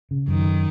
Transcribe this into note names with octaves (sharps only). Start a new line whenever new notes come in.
C#3
F#2 D#3